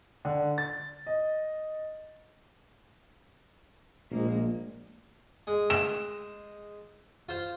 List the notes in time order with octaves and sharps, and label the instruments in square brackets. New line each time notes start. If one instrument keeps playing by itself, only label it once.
[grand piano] D3
A6
D#5
[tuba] A#1 [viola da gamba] G#3 A#3
[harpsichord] G#3
[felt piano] E7
[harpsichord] F4 C5